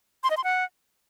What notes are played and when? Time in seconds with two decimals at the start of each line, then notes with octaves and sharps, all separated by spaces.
0.24 C6
0.30 D#5
0.37 C6
0.44 F#5